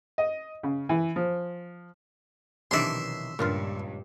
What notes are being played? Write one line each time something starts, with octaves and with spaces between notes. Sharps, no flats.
D#5
C#3
E3
F3
B1 C3 D#3 E3 D4 D5 E5 C6
C#2 G2 A#2 D4 F4